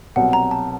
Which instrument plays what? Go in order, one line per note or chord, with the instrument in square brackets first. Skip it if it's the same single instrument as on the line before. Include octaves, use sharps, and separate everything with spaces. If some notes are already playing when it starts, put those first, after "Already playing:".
[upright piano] C2 B2 F#3 [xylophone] F#5
[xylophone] A#5
A5